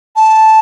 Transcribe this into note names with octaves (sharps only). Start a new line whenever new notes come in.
A5